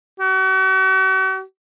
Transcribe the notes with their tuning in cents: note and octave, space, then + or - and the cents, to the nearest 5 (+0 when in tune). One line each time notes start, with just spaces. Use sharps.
F#4 +45